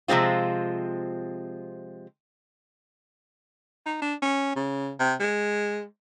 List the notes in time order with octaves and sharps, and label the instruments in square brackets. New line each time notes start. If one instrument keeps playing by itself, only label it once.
[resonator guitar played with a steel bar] C3 F3 G#3 C4 F4
[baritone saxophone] D#4
D4
C#4
C#3
C3
G#3